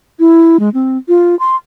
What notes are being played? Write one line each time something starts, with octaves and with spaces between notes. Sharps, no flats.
E4
G#3
C4
F4
C6